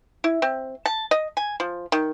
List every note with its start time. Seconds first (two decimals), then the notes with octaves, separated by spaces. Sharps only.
0.24 E4
0.42 C4
0.86 A5
1.11 D#5
1.37 G#5
1.60 F3
1.92 D#3